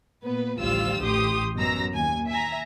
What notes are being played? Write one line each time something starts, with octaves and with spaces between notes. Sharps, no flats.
A#2 B3 B4
A1 D2 F3 G3 F4 E6
A1 G4 C6 D#6
F#2 B2 F#3 A#5 E6 A#6
D#2 G#5
E5 G#5 A#5